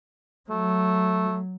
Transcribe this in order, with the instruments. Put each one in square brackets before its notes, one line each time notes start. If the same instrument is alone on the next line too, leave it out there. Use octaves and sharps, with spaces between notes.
[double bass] F#3 [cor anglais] A3